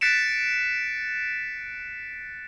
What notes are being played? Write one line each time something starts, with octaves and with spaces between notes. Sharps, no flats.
F#6 A6 B6 C#7 D7 E7